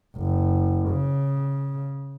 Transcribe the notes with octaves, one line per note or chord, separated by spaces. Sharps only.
F#1
C#3